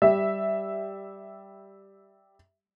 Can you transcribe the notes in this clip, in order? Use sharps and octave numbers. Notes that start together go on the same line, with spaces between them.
G3 E5